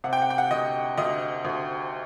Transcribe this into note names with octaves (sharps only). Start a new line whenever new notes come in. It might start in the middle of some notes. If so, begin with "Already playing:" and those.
C3 F#5
G5
F#5
G5
F#5
D2 D#5
D2 D#5
D2